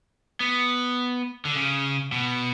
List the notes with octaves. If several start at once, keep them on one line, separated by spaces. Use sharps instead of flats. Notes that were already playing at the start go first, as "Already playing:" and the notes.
B3
D3
C#3
B2